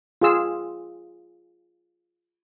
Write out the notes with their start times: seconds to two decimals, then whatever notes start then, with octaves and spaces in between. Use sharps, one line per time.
0.22 F4 G#4 E6